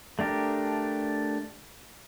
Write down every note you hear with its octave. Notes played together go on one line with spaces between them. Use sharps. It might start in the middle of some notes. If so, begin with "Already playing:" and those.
A3 D4 G4 A#4